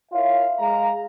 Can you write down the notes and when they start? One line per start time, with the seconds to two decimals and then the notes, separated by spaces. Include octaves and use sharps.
0.12 E4 F4 A#4 C#5 E5 F5
0.59 G#3 F5 A#5